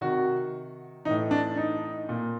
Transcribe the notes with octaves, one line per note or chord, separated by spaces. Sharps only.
C3 D#3 F#4
A2 E3 D#4
D4
D#4
A#2